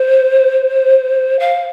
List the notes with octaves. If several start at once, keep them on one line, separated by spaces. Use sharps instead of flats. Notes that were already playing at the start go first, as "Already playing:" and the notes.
Already playing: C5
F5